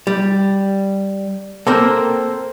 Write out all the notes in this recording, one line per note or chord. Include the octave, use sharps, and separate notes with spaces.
G3
A#3 C4 A4 A#4 C5